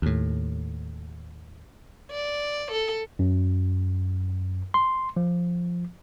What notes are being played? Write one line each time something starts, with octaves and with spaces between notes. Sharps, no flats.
D#2 A2
D5
A4
F#2
C6
F3